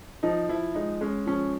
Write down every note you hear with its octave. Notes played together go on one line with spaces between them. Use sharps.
F3 D#4
F3 E4
G#3 D#4
G#3 C#4
F3 C#4